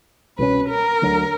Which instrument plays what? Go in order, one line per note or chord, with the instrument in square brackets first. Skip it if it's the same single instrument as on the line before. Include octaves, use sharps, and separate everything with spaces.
[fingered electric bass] C2 B2 G#3 C#4 [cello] B4
[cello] A#4
[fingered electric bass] D2 D3 F#3 A3